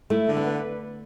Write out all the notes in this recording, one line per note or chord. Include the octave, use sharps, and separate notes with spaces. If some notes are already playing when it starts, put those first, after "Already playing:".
A3 E4
D3
B3
B4